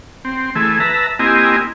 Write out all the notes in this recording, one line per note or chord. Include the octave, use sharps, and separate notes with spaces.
C4
E3 A3 G#4
B4 E5 A5 A#5
A#3 C4 E4 G4 D#5 G#5